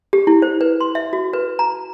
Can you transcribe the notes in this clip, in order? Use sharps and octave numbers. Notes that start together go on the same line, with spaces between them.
G4
E4
C5
B4
C6
E5
F#4
B4
A#5